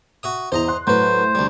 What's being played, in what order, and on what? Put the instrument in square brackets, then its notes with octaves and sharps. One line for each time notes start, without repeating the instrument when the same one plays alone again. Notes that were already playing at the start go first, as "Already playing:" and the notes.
[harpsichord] F#4 E5 D#6
[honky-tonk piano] E2 [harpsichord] C5 D#5 A#5
[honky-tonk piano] C6 F#6
[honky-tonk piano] A2 [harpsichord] F#3 B4 [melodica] C5
[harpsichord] D2 G3